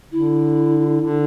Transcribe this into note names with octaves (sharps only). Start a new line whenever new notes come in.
D3 E4
D3